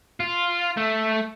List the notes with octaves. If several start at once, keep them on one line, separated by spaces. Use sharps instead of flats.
F4
A3